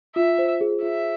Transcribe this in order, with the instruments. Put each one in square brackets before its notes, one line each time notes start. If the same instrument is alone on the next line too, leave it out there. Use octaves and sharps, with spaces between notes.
[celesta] F4 [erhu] E5
[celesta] C5
G#4
[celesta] F4 [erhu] E5